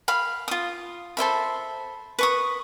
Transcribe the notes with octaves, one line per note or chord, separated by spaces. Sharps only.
F5 B5
F4 D#6
A4 C5 E5 B5
B4 C#6 D#6